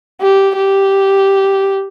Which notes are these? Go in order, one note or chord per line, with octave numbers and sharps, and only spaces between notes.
G4
G4